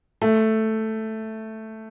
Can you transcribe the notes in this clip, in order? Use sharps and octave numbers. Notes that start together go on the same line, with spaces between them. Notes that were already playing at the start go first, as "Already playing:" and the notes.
A3